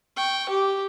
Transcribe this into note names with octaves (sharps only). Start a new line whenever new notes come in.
G5 C#6
G4